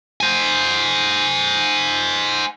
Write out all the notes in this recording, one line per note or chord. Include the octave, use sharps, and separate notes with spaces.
C5 G#5